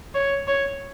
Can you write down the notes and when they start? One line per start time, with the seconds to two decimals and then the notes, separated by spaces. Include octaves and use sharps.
0.15 C#5
0.48 C#5